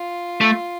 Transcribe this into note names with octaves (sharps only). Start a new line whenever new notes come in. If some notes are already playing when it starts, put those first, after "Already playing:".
Already playing: F4
A3